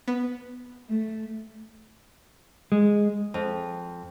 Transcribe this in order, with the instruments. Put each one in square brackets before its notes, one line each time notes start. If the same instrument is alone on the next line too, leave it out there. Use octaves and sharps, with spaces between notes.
[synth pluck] B3
[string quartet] A3
[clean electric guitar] G#3
[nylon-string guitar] F2